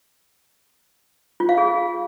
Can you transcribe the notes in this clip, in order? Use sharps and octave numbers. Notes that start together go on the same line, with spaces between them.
F4
F5
G#4